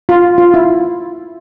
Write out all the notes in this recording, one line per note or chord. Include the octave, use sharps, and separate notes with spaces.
F4
F4
E4